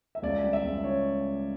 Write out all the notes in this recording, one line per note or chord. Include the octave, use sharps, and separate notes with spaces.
E5
C#2 D5
G3
E5
C#2
C#3 C#5